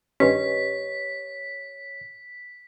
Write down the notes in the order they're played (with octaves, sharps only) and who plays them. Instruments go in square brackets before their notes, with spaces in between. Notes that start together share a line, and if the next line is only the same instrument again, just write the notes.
[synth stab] G2 D#3 C#4 [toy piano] G4 B4 D#5 [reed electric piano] C#5 [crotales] B6